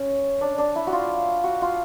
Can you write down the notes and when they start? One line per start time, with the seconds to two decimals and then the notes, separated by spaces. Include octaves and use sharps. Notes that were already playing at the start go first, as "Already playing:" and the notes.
Already playing: C#4
0.41 D4
0.58 D4
0.75 E4
0.87 F#4
0.92 F4
1.44 F#4
1.62 F4